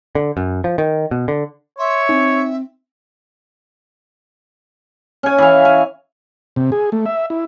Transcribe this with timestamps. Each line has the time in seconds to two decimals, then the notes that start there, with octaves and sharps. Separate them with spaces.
0.15 D3
0.37 F#2
0.64 F3
0.78 D#3
1.11 B2
1.28 D3
1.78 C#5 E5 C6
2.09 C4 D#4
5.23 C#4 G#5
5.38 E3 F5
5.65 G#5
6.56 C3
6.72 G#4
6.92 A3
7.06 E5
7.30 E4